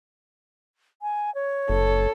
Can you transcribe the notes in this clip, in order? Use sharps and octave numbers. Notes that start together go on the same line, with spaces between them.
G#5
C#5
F#1 A4